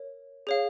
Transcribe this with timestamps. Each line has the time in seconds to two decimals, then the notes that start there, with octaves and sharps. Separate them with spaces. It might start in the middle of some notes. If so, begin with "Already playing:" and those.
Already playing: A#4 C#5
0.47 G#4 C#5 F5